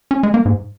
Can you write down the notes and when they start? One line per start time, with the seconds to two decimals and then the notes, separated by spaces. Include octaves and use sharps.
0.11 C#4
0.23 G#3
0.34 A#3
0.46 G#2